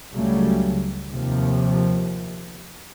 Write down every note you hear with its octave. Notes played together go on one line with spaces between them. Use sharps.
C#2 C#3 F#3 G3 A3
D#2 C3 F3